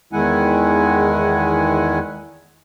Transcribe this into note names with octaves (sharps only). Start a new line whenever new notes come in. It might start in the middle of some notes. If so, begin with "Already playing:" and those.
E2 D#3 G#3 E4 F#5 G#5